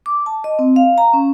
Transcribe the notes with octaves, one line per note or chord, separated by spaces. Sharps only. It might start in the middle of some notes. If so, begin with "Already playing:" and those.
D6
A5
D#5
C4
F5
A#5
C#4